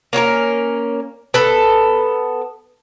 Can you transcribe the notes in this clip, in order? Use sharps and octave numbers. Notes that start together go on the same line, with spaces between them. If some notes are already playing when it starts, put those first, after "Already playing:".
A#3 C#4 F#4 A#4
B3 A4